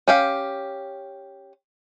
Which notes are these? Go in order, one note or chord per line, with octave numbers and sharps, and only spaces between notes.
C#4 G4 F5